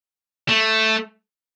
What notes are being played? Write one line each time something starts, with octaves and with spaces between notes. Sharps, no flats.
A3